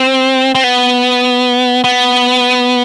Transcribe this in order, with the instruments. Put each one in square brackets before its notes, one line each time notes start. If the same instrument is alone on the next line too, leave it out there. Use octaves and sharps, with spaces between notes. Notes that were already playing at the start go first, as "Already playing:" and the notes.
Already playing: [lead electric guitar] C4
C4
B3
B3